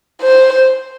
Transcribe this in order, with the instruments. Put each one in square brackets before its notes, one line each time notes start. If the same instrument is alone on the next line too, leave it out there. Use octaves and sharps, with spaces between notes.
[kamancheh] C5